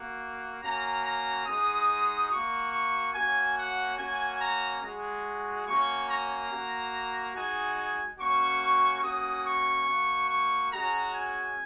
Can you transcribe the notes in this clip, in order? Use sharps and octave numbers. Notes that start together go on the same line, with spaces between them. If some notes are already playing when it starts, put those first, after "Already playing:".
Already playing: A#3 F#4
A#3 C#4 F#4 A#5
A#5
G#3 D#4 F#4 D#6
A#3 F#4 C#6
C#6
A#3 C#4 F#4 G#5
F#5
A#3 C#4 F#4 G#5
A#5
G#3 F#4
A#3 C#4 F#4 C#6
A#5
A#3 F#4
G#3 D#4 F#4 G#5
G#5
A#3 C#4 F#4 C#6
A#3 C#4 F#4 D#6
C#6
A#3 F#4
C#6
G#3 C#4 F#4 A#5
G#5